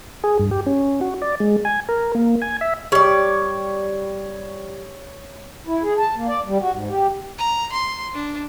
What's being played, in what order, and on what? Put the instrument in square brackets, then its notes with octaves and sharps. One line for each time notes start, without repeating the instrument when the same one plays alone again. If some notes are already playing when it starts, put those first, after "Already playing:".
[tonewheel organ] G#4
G2
G4
C#4
F#4
D5
G#3
G#5
A#4
A#3
G#5
E5
[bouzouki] G3 D5 [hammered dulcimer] C#5
[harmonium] E4
G#4
A5
A#3
D5
G3
F#4
G#2
G4
[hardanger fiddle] A#5
C6
D4